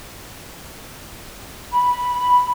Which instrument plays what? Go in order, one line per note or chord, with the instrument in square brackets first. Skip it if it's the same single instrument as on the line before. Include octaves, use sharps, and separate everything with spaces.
[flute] B5